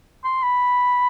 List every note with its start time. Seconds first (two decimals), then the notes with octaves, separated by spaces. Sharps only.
0.24 C6
0.43 B5